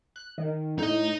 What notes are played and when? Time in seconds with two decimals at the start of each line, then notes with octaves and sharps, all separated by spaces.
0.16 F#6
0.38 D#3
0.79 A2 D#4 D#5